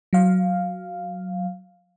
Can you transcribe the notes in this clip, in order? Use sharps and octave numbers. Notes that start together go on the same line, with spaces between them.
F#3 F5